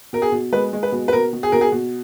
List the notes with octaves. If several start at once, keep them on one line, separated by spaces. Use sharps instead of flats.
B2 A#4
G#4
B2
G#3 B4
G#3
B4
B2
B4
B2 A#4
B2
G#4
B2 A#4
G#4
B2